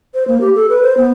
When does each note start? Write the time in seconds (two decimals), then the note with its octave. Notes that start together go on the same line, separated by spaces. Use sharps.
0.14 C5
0.28 A#3
0.41 G4
0.56 A4
0.69 B4
0.82 C5
0.97 B3